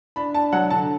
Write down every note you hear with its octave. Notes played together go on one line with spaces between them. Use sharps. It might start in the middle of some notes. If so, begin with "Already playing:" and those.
D4 B5
D4 A5
F#3 F#5
D3 A5